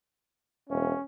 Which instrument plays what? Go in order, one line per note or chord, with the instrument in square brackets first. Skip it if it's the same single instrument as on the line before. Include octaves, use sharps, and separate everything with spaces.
[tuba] E1 [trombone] C#4